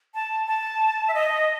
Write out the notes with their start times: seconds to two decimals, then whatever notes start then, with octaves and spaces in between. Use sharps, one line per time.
0.15 A5
0.47 A5
1.08 E5
1.14 D#5